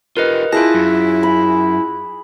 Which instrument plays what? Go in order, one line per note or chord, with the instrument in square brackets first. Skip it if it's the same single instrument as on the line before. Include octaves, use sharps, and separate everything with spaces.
[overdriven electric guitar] F4 G4 [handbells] A#4 B4 D#5
[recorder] E4 [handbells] F4 F#6 A#6 [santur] G#4 D#6 [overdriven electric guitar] A5
[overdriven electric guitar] F#2
[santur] B5